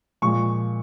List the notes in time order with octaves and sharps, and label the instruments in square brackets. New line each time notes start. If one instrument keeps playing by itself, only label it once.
[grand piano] A#2 F3 G#3 C#6